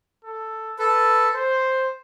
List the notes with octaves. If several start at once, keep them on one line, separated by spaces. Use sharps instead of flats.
A4
A4 B4
C5